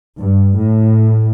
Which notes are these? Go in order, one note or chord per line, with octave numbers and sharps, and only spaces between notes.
G2
A2